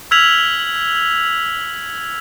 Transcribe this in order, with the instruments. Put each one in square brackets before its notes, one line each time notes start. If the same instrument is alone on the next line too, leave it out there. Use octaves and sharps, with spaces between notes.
[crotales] E6 F6 G#6 B6 F7 F#7